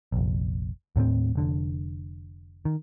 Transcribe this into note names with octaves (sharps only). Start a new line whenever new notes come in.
F1 A#1
D#2 A2 B3 C4
F1 D3
D#3